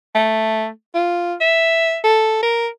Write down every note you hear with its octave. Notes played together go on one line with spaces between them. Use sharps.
A3
F4
E5
A4
A#4